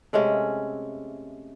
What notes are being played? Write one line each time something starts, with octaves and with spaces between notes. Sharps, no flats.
C3 G#3 A3 C#4